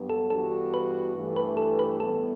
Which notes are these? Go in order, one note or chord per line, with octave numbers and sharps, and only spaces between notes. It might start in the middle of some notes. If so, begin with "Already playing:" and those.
Already playing: G2 F#3 B3
A4
G2 E3 B3 F#4 A4
B4
G2 E3 A3
B4
A4
B4
A2 G3 B3 A4